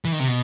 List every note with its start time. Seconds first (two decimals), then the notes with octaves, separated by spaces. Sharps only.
0.05 E3
0.12 D#3
0.20 C3
0.28 B2